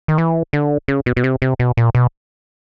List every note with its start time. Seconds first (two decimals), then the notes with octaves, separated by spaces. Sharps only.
0.08 D#3
0.18 E3
0.53 D3
0.88 C#3
1.06 B2
1.16 B2
1.24 C3
1.42 C3
1.59 B2
1.77 A#2
1.95 B2